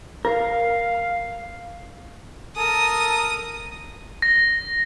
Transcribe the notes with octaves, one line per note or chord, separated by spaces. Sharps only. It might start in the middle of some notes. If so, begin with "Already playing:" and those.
A#4 F5
A4 A#4 D#6
A#6